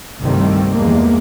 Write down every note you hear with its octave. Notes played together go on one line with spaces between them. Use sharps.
C2 G2 D#3 G3 A3 C4
E2 F3 G3 G#3 A#3